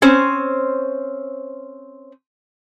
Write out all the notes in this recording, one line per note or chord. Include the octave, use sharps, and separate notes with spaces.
C4 C#4 C5